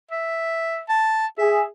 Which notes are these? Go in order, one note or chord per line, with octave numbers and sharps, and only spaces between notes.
E5
A5
G#4 E5